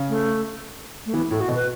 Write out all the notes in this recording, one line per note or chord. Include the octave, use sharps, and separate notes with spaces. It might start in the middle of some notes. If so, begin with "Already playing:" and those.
Already playing: C#3
A3
A3
E3 B3
A2 A4
F#4
B2
B4